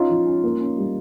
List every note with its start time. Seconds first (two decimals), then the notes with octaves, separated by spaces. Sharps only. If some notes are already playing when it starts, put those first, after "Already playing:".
Already playing: C#4 D#4 F4
0.09 F3
0.26 C#4
0.44 A#3
0.61 C#4
0.77 G3